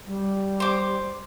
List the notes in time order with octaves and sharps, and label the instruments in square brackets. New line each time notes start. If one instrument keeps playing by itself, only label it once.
[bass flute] G3
[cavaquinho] C5 D6